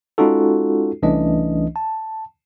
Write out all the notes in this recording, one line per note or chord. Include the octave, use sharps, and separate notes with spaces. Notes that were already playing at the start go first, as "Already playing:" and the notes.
G#3 C#4 D#4 F4 F#4 A4
C2 E3 A3 C#4 D4 D#5
A5